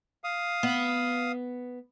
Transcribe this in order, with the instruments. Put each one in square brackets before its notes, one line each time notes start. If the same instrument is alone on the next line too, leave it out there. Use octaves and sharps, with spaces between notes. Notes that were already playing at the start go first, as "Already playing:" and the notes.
[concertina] F5 D#6
[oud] B3